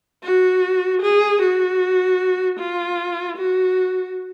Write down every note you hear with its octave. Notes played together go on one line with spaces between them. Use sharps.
F#4
G#4
F#4
F4
F#4